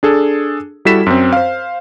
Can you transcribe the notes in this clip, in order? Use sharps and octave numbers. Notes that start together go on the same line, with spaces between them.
D4 G#4 A4
G3 E4 F#4 A4 B6 E7
F#2 C4
C5 F5